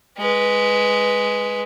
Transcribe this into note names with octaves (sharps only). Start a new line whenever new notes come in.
G#3 B4